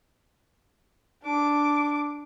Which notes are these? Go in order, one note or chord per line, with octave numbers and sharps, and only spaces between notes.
D4 D6